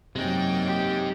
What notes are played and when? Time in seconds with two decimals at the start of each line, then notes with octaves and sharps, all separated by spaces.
0.16 F#2 C3 G#3 A#3 D#4 G5
0.66 G4